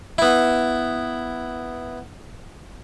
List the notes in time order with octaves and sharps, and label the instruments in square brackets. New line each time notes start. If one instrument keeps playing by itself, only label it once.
[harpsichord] B3 E4